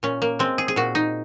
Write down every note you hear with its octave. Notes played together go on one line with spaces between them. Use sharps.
A#2 C#4
A#3
G#3 C4
G#4
G#4
A#2 F#4
D#4